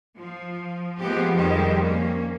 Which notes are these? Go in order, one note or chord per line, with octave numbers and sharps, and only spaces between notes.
F3
F3 G#3 B3 C4 G4
F2 D#3 G3 G#3 G4
A#3 C#4